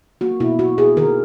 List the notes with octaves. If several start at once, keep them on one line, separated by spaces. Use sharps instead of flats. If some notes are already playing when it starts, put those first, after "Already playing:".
A#3 F#4
B2 E4
B2 F#4
B2 G#4
D#3 A#4